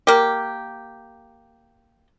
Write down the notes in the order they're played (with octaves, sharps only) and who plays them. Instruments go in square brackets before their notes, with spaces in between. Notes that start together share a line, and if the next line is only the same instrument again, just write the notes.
[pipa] A#3 G4